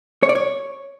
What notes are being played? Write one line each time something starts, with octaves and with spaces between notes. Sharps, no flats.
C#5
D5
C#5